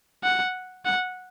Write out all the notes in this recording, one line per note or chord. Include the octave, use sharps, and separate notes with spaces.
F#5
F#5